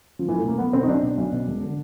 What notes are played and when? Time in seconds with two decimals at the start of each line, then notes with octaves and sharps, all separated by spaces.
0.19 F3
0.28 B1 E3
0.38 A3
0.43 B2 A#3
0.58 B1 B3
0.73 B2 C4
0.83 D#4
0.88 B1 D4
1.03 B2
1.18 B1
1.32 B2
1.47 E1
1.63 D3